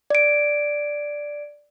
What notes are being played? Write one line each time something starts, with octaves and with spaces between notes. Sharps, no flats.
D5 D7